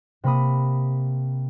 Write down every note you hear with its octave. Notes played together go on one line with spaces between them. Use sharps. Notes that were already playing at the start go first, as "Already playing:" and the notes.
C3 A#3 B5 D#6